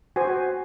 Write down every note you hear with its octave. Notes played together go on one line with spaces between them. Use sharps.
F#4 C5 G#5